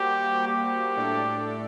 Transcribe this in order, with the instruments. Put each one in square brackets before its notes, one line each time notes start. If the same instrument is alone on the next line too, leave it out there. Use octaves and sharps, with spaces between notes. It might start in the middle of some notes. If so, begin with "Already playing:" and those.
Already playing: [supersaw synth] G3 A#3 F#4 C5 [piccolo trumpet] G4
[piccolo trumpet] G4
[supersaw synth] A2 A3 D4 A4 D5